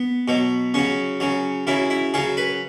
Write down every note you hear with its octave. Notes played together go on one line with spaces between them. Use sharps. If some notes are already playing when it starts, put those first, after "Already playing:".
Already playing: B3
B2 F#3
C#3 F#3 C#4
C#3 F#3
C#3 F#3 E4
E4
C#3 F#3 G#4
B4